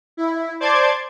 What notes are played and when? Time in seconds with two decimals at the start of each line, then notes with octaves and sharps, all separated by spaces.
0.17 E4
0.60 C5 D5 A5 C6 D6 G#6